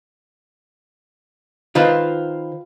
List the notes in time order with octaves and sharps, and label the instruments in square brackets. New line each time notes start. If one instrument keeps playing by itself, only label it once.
[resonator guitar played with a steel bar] D#3 C5 F5 [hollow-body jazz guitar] F4 B4